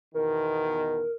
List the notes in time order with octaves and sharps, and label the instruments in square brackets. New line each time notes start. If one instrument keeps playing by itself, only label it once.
[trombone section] E2 B2 D#3 [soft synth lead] A#4